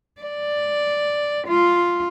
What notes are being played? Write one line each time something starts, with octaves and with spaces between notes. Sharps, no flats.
D5
F4